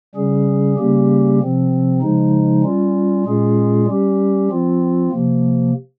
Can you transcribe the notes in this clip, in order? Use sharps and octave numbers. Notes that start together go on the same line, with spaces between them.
C#3 G3 C#4 G#4
C#3 G3 A#3 C#4 G4
C3 F3 C4
C#3 F3 G#3 D#4
G3 C#4 F4
A#2 G#3 C#4 F4 G#4
G3 C#4 G4
F3 C4 F4
C3 F3 A#3